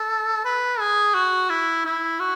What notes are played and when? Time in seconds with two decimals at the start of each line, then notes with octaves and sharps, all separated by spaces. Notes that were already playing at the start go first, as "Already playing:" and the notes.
Already playing: A4
0.45 B4
0.80 G#4
1.15 F#4
1.50 E4
1.85 E4
2.20 F#4